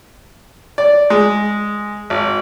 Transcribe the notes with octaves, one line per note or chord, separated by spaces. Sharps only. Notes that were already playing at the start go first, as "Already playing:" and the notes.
D5
G#3
G#1